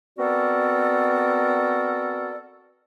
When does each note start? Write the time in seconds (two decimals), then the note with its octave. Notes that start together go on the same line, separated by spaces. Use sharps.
0.19 B3 C4 F#4 A4 A#4 D5